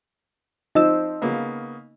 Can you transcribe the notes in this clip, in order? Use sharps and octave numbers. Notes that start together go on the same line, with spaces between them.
F3 C4 D#4 D#5 E6
C#3 A#3 B3